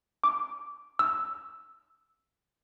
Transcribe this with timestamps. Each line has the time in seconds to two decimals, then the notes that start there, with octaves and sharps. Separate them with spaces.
0.24 D6
0.99 E6